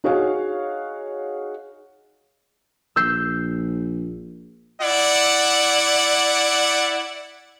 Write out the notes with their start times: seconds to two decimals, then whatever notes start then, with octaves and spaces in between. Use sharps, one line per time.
0.04 D#4 F#4 G#4 C#5 F5
2.96 A#1 E6 G6 C7
4.82 E4 D5 F#5